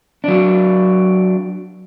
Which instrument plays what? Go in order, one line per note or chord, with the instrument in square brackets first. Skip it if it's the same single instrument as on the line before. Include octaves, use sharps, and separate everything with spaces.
[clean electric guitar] F#3 D4